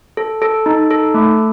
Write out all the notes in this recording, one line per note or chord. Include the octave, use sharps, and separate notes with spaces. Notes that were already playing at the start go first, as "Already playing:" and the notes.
A4
A4
D#4
A4
A3